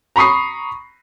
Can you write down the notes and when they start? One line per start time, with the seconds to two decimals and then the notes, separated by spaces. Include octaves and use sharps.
0.16 A#5 B5 C#6 D#6 C7